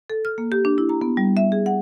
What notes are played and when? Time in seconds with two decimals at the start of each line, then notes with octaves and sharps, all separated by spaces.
0.10 A4
0.25 F6
0.38 A#3
0.52 G4
0.65 D4
0.78 E4
0.89 A#5
1.01 B3
1.17 G3
1.37 E5
1.52 G#4
1.66 F#5